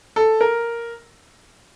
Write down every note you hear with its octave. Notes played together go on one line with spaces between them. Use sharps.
A4
A#4